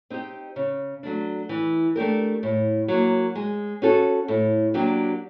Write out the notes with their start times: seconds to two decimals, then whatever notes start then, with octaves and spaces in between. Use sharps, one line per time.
0.10 C4 D#4 G4
0.56 C#3
1.03 F#3 A3 D4
1.49 E3
1.96 A3 D4 G4 A#4
2.43 A2
2.88 F#3 A#3
3.35 G#3
3.82 C#4 F#4 A4
4.28 A2
4.74 F#3 A#3 D4 G4